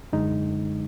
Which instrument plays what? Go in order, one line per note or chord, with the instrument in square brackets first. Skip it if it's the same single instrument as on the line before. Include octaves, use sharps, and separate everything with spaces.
[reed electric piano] F#2 D3 G#3 D#4